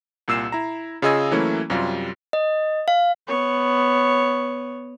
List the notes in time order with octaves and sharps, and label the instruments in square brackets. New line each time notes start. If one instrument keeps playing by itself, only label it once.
[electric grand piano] C2 A#2 E6 C7 E7
E4 A#5
C#3 F4 G#4 D#5 E6 G#6
E3 F#3 A3 A#3 C#4 E4
F#2 C3 G3 F4
[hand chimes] D#5
F5
[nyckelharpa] B3 C#5